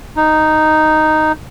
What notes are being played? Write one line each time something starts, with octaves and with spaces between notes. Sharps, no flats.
D#4